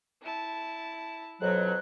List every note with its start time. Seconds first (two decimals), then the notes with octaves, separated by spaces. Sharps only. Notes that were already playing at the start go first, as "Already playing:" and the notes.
0.22 E4 A5
1.41 F2 B2 F#3 F#6